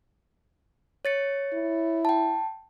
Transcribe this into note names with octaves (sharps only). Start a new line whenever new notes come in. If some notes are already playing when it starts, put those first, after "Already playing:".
C#5 A6 C#7
E4
G5 A5